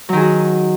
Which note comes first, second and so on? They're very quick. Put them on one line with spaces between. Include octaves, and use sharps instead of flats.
F#3 D#3 G#4 F#4